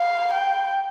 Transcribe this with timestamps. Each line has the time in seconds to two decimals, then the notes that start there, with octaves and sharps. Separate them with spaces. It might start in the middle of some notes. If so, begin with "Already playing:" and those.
Already playing: F5
0.33 G5